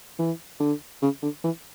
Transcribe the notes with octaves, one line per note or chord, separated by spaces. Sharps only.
E3
D3
C#3
D3
E3